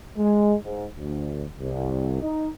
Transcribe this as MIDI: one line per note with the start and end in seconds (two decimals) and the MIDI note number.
0.18 0.54 56
0.64 0.85 44
0.96 1.43 38
1.59 2.19 36
2.21 2.48 63